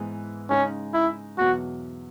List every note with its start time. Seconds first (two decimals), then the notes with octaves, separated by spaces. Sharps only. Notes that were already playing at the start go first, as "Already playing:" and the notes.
Already playing: G#2 E3 G#3 B3
0.50 C#3 G#3 C#4 D#4
0.94 E4
1.37 E2 B2 F#3 F#4